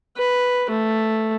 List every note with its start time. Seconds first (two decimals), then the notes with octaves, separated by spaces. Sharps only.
0.17 B4
0.70 A3